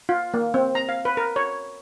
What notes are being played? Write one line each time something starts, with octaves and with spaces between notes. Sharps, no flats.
F4
A#3
C4
A#5
F5
B4
A#4
C#5